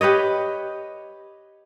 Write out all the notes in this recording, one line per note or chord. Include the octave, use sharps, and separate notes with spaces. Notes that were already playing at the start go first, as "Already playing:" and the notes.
G4 B4 C#5 D#5